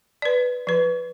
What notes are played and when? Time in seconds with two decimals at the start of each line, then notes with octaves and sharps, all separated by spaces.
0.22 B4 D5
0.67 F3 B4